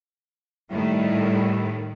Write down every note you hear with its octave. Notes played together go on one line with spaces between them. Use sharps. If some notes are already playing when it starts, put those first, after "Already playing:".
A2 D#3 G3 A3 E4